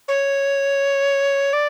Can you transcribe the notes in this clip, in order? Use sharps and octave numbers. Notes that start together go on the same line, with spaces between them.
C#5
D5